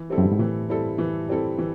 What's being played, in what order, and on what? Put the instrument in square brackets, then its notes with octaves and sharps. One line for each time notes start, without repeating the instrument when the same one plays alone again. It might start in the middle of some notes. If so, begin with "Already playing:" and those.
Already playing: [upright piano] E3
G3 C4 E4 A4
[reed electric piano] F#2
G2
G#2
[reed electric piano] A2 [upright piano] E3
[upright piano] G3 C4 E4 A4
E3
G3 C4 E4 A4
E3